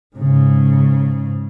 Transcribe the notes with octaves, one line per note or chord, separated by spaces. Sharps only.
G#2 C#3